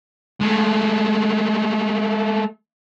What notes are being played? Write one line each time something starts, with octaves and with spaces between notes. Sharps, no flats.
G#3 A3